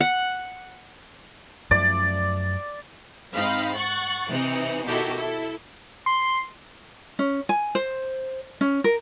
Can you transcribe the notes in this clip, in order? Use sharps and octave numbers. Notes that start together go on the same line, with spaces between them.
F#5
F#2 F3 A3 D5
G#2 C4 D#4 F5 B5
F#5 C#6 F#6 A6
C3 E3 D#4
B2 D#3 E4 F#4 G4 A4
E4 A4
C6
C#4
G#5
C5
C#4
A#4